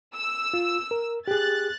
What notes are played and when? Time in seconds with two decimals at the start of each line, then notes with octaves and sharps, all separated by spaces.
0.15 E6
0.54 F4
0.91 A#4
1.28 G4 G#4 F#6 A6